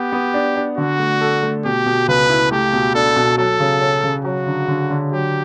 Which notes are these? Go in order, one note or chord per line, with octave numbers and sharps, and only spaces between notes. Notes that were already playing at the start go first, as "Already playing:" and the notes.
Already playing: B3 G4
B3
D4
D4
D3 F#4
A3
A4
A3
B2 G4
B2
C#2 B4
E4
A3 G4
B2
D4 A4
B2
F#3 A4
C#3
C#4
C#3
F#3 F#4
D3
D3
D3
F#3 G4